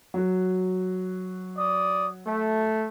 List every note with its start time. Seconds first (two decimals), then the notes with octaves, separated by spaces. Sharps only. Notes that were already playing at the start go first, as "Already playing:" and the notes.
0.14 F#3 F#4
1.57 D5 D#6
2.25 A3